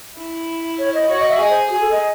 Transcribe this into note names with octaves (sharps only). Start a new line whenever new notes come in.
E4
C#5
D#5
F#4 C#5
D#5
E5
G#4 D#5
C5
F#4 G#4
A4
D#5